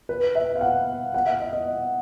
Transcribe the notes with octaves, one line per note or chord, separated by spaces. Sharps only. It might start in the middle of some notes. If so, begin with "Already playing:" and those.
B4
E5
F5
F#5
F#5
E5
D#5
D#5